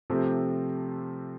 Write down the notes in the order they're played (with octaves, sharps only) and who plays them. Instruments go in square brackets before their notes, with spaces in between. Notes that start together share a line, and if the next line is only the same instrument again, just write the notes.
[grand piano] C3 F3 A3 C4 G4